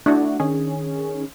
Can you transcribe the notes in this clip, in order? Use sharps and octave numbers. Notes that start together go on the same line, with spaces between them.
A3 D4 E4 F#4
D#3 C#4 G#4